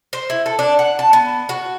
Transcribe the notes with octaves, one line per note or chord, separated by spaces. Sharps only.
C5
E4
A4
D4
F#5
A5
B3
F#4